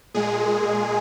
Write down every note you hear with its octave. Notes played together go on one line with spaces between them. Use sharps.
A#2 G#3 G#4